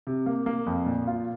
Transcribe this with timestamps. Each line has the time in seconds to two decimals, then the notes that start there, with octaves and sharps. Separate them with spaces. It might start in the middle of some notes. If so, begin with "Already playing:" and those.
0.07 C3
0.26 A#3
0.46 A#3
0.66 F2
0.86 A#2
1.07 F4